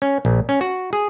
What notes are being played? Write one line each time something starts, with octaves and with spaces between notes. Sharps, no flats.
C#4
A#1
C#4
F#4
G#4